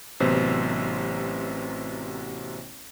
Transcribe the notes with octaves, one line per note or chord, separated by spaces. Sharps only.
A1 C3 F#3 B3 C5 E6